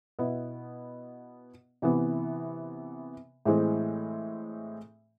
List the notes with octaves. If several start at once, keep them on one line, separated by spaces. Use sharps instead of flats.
B2 B3 E4
C3 E3 B3
A2 E3 G#3 C4